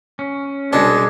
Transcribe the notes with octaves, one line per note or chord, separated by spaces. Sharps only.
C#4
C2 B2 G#3 D4 A4